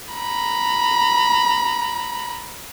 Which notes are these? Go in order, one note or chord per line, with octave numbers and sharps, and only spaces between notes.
A#5 B5